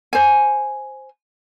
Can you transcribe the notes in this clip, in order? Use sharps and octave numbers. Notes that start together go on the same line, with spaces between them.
C5 G#5